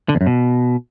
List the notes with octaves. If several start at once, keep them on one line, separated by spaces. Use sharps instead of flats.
D3
E2
F#2
B2